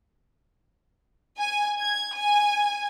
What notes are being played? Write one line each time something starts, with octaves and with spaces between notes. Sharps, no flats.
G#5
G#6
G#5